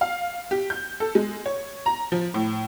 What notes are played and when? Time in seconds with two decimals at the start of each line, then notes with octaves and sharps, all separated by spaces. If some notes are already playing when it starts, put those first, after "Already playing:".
0.01 F5
0.51 G4
0.70 G6
1.00 A4
1.15 G#3
1.46 C#5
1.86 A#5
2.12 F3
2.34 A2